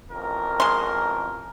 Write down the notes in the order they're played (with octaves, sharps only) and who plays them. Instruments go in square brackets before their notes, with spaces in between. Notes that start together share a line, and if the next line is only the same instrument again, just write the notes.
[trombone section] A1 F2 A#4
[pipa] G#3 C6